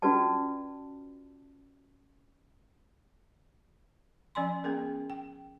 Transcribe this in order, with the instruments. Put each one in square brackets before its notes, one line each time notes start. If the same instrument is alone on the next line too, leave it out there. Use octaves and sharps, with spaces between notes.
[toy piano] C#4 F4 F#4 B4 D5 A5
[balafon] F3 C#4 D5 G#5 B5 C6
B3 C#4 G#4 A#4
G5